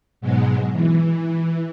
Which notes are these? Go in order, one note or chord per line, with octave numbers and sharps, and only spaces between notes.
G#2 B2 F#3 G#3
E3